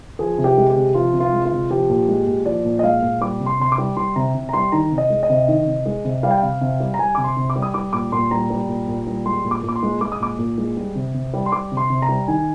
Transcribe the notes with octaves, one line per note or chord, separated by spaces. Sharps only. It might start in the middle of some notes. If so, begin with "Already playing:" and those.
F3 G#4
C3
G4
G#3
G4
C3
F3 F4
C3
F4
G#3
F4
C3
F3 G4
A#2
G#3
A#2
F3 D5
A#2
D#5
G#3 F5
A#2
G3 D6
C3
C6
C3 C6
D6
G3
G3 C6
C3 A#5
C3
A#5
G3 C6
D#3 A#5
C3
D#5
G#3
D#5
C3
D#3
C3
G#3
C3
G3 F5
G5
C3 F5
C3
G3
A#5
G3 G#5
C3 D6
C6
C3
D6
G3
D#6
G3 D6
A#2 D6
A#2 C6
G3 A#5
G3
A#2
A#2
G3
G#3 C6
A#2
D6
A#2
D6
C6
G#3
G#3 D6
D#6
A#2 D6
A#2
G#3
G3
C3
C3
G3
C6
G3 D6
C3
C6
C3
A#5
G3
D#3 G#5